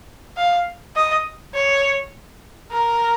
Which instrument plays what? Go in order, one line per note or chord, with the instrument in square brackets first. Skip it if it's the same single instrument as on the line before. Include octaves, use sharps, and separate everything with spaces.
[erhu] F5
D#5
C#5
A#4